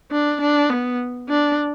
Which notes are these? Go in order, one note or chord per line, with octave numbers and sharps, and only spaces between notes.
D4
D4
B3
D4